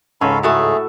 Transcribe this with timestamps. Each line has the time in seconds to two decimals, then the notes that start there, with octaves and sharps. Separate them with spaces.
0.21 C#2 G#2 C#4 A4 F5 B5
0.43 A2 A3 F#4 G#4 A4 E5